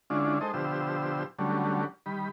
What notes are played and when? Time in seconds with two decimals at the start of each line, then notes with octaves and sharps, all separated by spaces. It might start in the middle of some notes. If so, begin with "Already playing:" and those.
0.10 D3 G#3 C#4 D4 E4 F4
0.41 G#3 D#4 A4 C5 D#5
0.54 B2 D3 F3 G4 C5 E6
1.39 D3 F#3 G3 A3 C#4
2.06 D#3 G3 B5